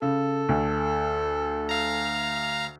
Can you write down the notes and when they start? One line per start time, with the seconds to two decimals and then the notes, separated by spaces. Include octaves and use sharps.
0.02 C#3 A4
0.49 D2
1.69 F5 A#5